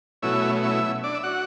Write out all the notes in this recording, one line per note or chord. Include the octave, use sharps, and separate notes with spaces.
B2 F#3 A3 C#4 E4 E5
E4 E5
D4 D5
E5
F#4 F#5